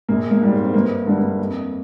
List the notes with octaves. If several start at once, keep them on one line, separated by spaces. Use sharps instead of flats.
A#1 A#3
A#3
G#2 G3
C4
C4
G1 A#3
G2 D3 G3
A#3
F2